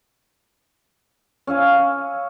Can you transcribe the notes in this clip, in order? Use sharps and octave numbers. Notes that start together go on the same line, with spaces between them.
C#4 E5 F5 G#5